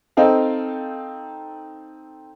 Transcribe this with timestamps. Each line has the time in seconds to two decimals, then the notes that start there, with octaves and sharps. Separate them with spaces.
0.17 C4 D#4 A4 F5